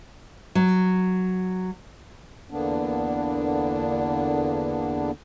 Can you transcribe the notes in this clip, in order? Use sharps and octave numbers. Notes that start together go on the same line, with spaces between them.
F#3
E2 D3 A#3 B3 D4